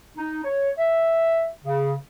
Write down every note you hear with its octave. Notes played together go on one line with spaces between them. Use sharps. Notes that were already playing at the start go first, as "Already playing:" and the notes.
D#4
C#5
E5
C#3